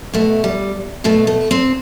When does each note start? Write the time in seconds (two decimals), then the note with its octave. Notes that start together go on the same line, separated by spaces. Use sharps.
0.13 B2 A3
0.44 G3
1.04 B2 A3
1.27 A3
1.51 C4